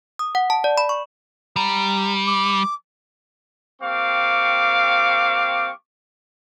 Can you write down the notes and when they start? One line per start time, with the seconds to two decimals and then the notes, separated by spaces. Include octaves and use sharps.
0.19 D#6
0.35 F#5
0.50 A5
0.64 D5
0.78 B5
0.89 C#6
1.56 G3 A#5
2.26 D6
3.82 G3 A#3 C4 F5 C#6 D6